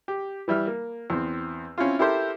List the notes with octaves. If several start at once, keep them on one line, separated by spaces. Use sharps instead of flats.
G4
E3 G3 E5 F6
A#3
E2 C4
C4 C#4 E4 F4
E4 G4 A4 A#4 C5 E5